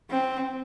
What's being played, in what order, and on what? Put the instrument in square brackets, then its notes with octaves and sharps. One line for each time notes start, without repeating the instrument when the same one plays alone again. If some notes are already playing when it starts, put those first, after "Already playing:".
[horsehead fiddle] C4